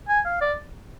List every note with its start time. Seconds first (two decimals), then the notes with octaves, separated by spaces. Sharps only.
0.08 G#5
0.25 F5
0.41 D5